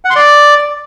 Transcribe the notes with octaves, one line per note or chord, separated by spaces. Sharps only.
F#5
C6
D5